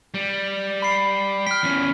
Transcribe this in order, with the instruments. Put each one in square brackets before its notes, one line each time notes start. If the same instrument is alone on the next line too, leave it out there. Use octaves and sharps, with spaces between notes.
[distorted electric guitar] G3
[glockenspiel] B5 C7
[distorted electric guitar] G5 [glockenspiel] F6 B6
[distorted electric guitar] E2 C#4